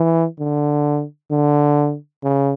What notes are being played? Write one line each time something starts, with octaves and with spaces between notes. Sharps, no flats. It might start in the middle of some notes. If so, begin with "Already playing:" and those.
Already playing: E3
D3
D3
C#3